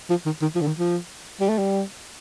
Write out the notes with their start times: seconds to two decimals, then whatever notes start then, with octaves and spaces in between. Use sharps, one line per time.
0.10 F3
0.26 D#3
0.42 D#3
0.55 F3
0.61 D3
0.67 D#3
0.78 F3
1.40 G3
1.49 A3
1.58 G3